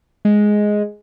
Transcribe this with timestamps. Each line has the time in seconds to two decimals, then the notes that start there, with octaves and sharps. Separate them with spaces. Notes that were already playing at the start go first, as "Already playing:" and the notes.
0.25 G#3